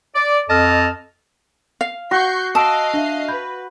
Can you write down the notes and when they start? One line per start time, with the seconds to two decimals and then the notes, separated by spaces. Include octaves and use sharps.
0.15 D5
0.49 F2 A4 D#5 A5 F6
1.81 F5
2.11 F#4 C#6 G6 C7
2.55 D#5 F5 A5 D#6 E6 C7 D7
2.94 D4 E5
3.28 B4 B5 G6